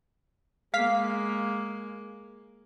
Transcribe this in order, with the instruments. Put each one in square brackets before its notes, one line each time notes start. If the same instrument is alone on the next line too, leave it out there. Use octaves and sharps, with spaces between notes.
[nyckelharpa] G#3 A#3 [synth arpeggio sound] F5 B6